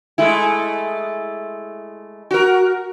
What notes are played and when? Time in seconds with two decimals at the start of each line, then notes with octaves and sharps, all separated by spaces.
0.18 G#3 A3 E4
2.31 F#4 A#4